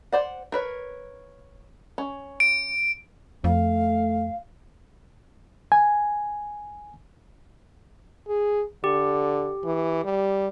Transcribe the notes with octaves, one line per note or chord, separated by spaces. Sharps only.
C5 D5 F#5
A#4 B4 C#5
C#4
D7
F2 A3 F5
G#5
G#4
D3 G4
E3
G3